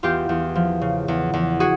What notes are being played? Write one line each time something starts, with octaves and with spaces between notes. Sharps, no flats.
E2 F4 G4
E2
F3
C#3
E2
E2
F#4 G#4